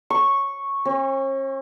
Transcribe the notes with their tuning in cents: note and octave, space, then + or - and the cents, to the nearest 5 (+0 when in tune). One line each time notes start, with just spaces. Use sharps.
C#6 -5
C#4 -45